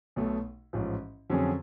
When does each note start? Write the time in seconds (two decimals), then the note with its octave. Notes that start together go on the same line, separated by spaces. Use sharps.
0.16 B1 B2 A3
0.73 A1 G#2 F3
1.30 F2 D3 F#3 C#4 G#4